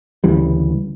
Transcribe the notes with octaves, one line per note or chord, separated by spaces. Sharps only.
D2 C#3 E3 G3